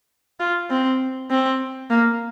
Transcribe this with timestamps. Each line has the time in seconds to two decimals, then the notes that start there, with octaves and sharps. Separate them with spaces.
0.40 F4
0.70 C4
1.31 C4
1.90 A#3